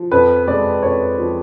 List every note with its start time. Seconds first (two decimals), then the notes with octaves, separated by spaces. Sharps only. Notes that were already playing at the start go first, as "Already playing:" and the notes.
Already playing: F3
0.11 F2 B4
0.47 G#3 D5
0.83 F2 C#5
1.19 F3